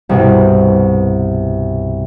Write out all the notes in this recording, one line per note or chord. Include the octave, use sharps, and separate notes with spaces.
C2 G2 B2